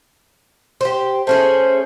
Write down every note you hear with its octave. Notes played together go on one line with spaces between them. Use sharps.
G4 C5
A3 C#4 G#4 C5